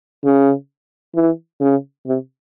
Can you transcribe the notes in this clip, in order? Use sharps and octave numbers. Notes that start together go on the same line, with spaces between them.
C#3
E3
C#3
C3